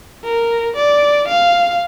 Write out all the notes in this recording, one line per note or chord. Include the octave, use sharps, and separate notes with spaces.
A#4
D5
F5